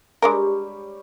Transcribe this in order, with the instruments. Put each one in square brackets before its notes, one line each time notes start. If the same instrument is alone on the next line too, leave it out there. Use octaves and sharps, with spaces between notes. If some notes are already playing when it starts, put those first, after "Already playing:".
[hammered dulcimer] G3 G4 C#5 [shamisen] G#3 D4 A#4